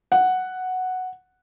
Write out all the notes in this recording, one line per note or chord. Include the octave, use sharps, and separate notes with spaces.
F#5